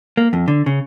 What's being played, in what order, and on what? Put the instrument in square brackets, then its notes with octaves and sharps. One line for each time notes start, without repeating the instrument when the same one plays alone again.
[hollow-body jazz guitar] A#3
F2
D3
C#3